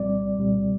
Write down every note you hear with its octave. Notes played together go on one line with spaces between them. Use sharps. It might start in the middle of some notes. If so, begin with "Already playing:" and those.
Already playing: C2 A#2 G3 C4 D5
C2 A#2 G3 C4